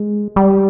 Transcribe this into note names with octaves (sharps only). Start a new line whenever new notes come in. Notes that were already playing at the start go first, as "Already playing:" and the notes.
Already playing: G#3
G3